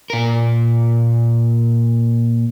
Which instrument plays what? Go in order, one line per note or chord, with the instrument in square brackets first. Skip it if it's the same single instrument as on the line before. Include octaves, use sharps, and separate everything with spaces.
[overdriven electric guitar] A#2 A#4